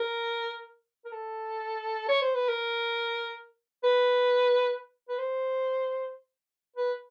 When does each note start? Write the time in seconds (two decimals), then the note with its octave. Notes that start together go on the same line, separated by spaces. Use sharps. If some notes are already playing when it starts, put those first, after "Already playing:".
Already playing: A#4
1.05 A#4
1.12 A4
2.08 C#5
2.22 C5
2.35 B4
2.48 A#4
3.84 B4
5.09 B4
5.18 C5
6.76 B4